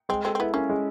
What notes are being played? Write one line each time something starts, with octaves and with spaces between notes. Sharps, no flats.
G#3 C4
C4 A4
C4
B3 E4
A#3 C#4
G#3